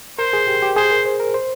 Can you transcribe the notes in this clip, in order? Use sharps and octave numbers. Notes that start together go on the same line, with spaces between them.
A#4 C5
G#4
G4
G4
G#4 C5
A#4
C5
A#4
C5